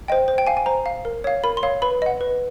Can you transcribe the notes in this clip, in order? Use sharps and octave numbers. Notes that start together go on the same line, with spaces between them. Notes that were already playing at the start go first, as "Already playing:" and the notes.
C5 D#5 G5
C5
G5
F5 G#5
G#5
C5 A#5
F5
A#4
C#5 F5
A#4 B5
C6
C#5 F5
B4 B5
D#5 F#5
B4